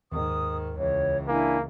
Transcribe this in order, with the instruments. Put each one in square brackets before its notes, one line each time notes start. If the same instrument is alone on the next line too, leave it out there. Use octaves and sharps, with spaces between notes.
[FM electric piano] D#2 [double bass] G#2 D#3 [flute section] D#6
[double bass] C#2 E3 [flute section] C#5
[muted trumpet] A#3 [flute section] D4 E4 G#5